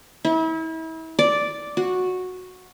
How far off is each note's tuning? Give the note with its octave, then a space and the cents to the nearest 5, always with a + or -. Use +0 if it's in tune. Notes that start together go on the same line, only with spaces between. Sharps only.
E4 -35
D5 -5
F#4 -10